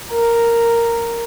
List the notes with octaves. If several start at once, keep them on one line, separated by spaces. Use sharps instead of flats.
A#4